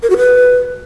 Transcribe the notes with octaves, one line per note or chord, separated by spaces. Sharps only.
A#4
F#4
B4